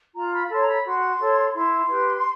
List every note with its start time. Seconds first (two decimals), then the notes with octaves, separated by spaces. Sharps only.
0.16 F4 A#5
0.34 B5
0.46 B5
0.51 A4 C#5 C6
0.62 A#5
0.68 B5
0.86 F#4 C6
1.20 A4 C#5
1.55 E4 C6
1.89 G4 B4